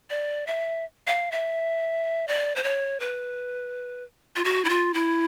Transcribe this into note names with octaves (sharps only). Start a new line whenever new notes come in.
D5
E5
F5
E5
D5
C5
C#5
B4
F4
F#4
E4
F4
E4